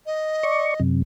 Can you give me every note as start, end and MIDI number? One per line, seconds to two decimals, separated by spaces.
0.06 0.80 75
0.43 0.74 74
0.43 0.74 85
0.80 1.02 42
0.80 1.02 48